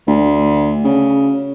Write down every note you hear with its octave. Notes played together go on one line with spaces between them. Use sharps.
D2
C#3